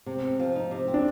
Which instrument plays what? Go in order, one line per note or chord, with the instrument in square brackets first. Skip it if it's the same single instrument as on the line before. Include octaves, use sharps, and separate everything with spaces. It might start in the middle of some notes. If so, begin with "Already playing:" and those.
[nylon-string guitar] C3
C4
F3
D#4
C3
C4
[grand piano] D4